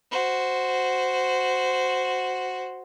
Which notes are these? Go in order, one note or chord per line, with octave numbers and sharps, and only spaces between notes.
F#4 C5